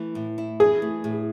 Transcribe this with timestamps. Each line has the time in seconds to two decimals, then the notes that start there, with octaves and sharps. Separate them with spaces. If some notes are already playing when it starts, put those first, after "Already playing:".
Already playing: E3 A3
0.15 A2
0.38 E4
0.60 E3 G#4
0.82 A3
1.04 A2